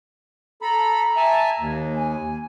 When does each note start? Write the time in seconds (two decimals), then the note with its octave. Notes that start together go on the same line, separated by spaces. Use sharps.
0.62 A4 A#5 B5
1.17 E5 G#5 A5
1.59 D#2
1.95 G#5